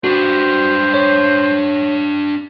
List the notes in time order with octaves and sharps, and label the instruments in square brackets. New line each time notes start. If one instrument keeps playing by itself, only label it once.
[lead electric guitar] D4 B4 [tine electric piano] F#4 [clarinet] C5
[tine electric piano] C#5